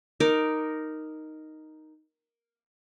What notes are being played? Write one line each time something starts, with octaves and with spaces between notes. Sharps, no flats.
D#4 A#4 D6